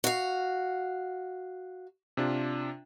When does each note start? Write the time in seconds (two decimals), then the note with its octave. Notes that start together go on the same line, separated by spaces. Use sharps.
0.04 F#4 F5
2.17 C3 D4 F4